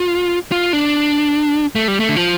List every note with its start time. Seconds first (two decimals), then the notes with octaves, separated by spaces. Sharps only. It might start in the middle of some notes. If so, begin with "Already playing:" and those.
Already playing: F4
0.52 F4
0.73 D4
1.76 A3
1.88 G3
2.00 A3
2.09 D3
2.16 F3